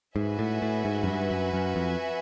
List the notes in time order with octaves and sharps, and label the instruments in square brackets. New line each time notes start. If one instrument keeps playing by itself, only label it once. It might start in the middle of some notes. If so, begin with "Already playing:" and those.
[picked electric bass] G#2 [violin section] F#4 B4 E5 G#5
[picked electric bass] A2
A2
G#2
F#2
G2
F#2
F#2
F2